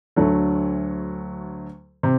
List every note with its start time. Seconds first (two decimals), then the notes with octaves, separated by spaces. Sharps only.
0.16 D2 D3 F#3 A3
2.03 C3